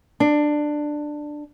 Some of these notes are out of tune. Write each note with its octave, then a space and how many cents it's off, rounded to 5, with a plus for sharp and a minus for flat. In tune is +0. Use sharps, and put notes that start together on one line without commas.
D4 +15